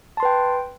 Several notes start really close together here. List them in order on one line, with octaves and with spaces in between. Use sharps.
A5 C6 B4 G5